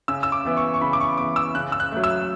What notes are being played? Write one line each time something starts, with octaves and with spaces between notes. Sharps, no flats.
C#3 E6
E6
D6
E3 B3
C#6
C#6
C#3 B5
D6
C#6
E3 B3 D6
E6
C#3 F#6
E6
F#6
F#3 A3
E6